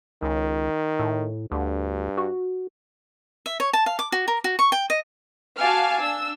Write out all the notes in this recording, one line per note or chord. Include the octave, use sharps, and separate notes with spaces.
C#2 D#3
A2
D2 G2
F#4
E5
C#5
A5
F5
D6
F#4
A#4
F#4
C#6
G5
D#5
F#4 F5 G#5 A5 D6 F6
D4 E6